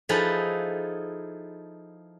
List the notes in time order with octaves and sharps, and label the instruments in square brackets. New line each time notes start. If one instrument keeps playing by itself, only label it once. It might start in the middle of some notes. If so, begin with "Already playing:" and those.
[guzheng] F3 D#4 E4 G#4 A4 B4